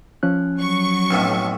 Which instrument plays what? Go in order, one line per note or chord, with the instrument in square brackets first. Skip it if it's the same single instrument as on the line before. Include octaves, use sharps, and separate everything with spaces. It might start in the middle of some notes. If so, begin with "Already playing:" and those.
[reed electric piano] F3 C#4 F#6
[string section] F#3 C#6
[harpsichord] B1 F2 A2